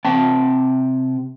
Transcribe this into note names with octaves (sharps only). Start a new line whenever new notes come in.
C3 C4 G5 A5